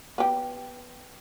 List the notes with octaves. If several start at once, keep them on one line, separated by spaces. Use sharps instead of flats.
B3 G4